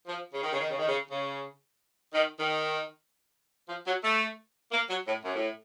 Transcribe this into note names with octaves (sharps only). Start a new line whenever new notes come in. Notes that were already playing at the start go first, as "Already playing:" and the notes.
F3
C#3
D#3
C#3
D#3
C#3
D#3
C#3
C#3
D#3
D#3
F3
F#3
A3
A#3
F#3
A2
F#2
A2